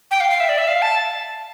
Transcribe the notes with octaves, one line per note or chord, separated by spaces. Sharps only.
G5
F5
F5
E5
D5
E5
F5
A5